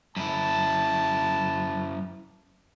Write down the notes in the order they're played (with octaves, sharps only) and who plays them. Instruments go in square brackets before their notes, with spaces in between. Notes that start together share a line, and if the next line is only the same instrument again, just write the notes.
[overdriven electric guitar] F#2 E4 [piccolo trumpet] A5